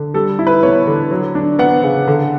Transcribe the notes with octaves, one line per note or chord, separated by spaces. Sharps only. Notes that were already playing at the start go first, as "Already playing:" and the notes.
Already playing: D3
G3 A4
E4
B4
B3 C#5
D3
F#3
D4
B3 F#5
C#3
D3